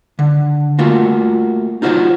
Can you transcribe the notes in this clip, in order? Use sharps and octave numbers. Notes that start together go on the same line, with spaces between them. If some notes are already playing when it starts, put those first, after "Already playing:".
D3
A3 A#3 F4 F#4
D#4 F4 F#4 A4 C5 C#5